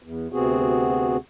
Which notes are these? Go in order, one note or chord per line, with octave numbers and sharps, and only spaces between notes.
E2
D2 C3 B3 C4 F#4 G#4